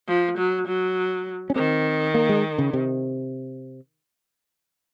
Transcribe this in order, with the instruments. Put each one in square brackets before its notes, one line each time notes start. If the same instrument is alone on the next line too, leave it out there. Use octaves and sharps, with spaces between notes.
[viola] F3
F#3
F#3
[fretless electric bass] C#4
[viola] D#3 [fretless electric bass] C4
[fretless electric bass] A#3
G#3
C#3
C3